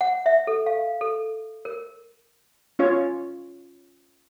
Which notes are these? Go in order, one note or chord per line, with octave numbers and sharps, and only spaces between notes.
F#5
E5
A4
F5
A4
A#4
C#4 F4 C#5